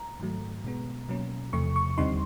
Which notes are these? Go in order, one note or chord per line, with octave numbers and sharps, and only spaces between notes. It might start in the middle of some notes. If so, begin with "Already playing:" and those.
Already playing: A#5
G#2 D#3 F#3 A3
B2 G#3 B3
B2 F#3 A#3 C#4
E2 C3 F3 A3 C#6
C#6
D#2 D3 G3 C4 D#4 C6